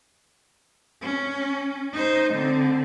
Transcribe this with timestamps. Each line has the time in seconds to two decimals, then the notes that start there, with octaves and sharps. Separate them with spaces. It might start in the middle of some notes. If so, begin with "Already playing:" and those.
1.01 C#4
1.92 D#4 C5
2.34 D3 C4